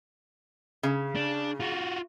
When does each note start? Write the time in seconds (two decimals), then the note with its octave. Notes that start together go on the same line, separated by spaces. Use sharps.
0.83 C#3
1.15 D4
1.60 F4 F#4